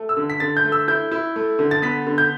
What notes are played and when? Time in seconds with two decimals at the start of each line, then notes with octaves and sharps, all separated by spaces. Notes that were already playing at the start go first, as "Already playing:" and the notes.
Already playing: A3
0.09 E6
0.17 D3
0.30 B6
0.40 D3 A6
0.57 G6
0.64 A3
0.72 E6
0.88 E4 G6
1.11 E4
1.36 A3
1.59 D3
1.71 A6
1.82 B3 B6
2.07 D3
2.18 G6